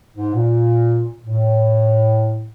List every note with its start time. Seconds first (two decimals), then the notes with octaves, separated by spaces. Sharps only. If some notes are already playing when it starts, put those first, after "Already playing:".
0.15 G#2
0.34 A#2
1.24 A2